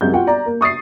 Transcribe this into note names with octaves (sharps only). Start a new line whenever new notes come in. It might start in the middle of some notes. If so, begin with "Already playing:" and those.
C2 F#2 G#3 G6
F4 F#4 F#5 G5
D5 A#5
A#3
C#6 D#6 A6 C7